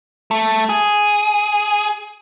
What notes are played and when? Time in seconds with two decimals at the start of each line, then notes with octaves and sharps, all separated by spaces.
0.31 A3
0.69 G#4